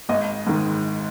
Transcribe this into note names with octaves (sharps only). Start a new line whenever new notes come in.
G#1 D#5
G#2 D#3